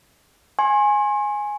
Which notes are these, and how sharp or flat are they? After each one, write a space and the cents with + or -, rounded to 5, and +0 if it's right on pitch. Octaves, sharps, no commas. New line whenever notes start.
G#5 +0 C6 +40